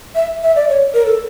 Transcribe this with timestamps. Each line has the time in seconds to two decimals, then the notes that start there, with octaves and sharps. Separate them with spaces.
0.15 E5
0.43 E5
0.56 D5
0.69 C#5
0.94 A#4
1.06 A4